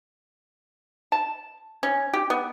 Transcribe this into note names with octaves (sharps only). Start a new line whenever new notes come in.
A5
C#4
G4
B3